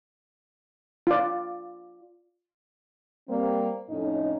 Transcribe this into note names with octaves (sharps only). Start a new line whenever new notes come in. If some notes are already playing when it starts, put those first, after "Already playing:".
F4 D5
G3 A#3 C4
F2 A2 C#4 D#4